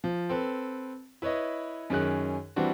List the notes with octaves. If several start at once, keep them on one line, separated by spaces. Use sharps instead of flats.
F3
C4 A4 B4
E4 B4 C#5 D#5
F#2 D#3 C#4 G#4 F#6
E3 G3 C4 D4 F#4